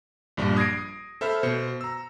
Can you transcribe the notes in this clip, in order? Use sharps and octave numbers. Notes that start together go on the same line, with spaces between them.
A#1 G2 G3
D#6 G#6 A#6 C7 D7
A4 C5 E5 B5 F6
B2 C5 C#7
A#5 E6